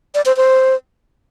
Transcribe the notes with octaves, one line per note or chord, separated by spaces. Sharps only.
D5
C5
C5